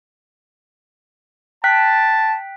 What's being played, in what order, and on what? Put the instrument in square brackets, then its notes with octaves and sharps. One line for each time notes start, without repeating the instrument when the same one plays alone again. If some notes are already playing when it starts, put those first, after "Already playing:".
[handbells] G5 F#6 B6 [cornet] A5